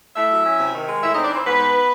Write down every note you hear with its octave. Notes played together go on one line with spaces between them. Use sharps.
A3 E4 E5
F#3
C#4
C3
D#3
G#3
A2 E4 E5
D#4 D#5
C4
D4 D5
E3 C4 C5
G#2 B3 B4
G#2